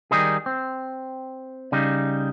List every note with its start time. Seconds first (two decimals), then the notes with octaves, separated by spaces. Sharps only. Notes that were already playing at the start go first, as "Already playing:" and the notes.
0.11 D#3 G3 D#4 G#4
0.46 C4
1.72 C#3 G3 D#4